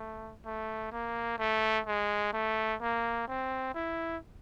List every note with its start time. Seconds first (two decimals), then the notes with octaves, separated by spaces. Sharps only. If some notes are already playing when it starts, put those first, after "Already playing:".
Already playing: A3
0.45 A3
0.92 A#3
1.38 A3
1.86 G#3
2.33 A3
2.81 A#3
3.28 C4
3.74 E4